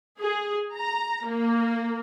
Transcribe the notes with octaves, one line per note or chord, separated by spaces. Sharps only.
G#4
A#5
A#3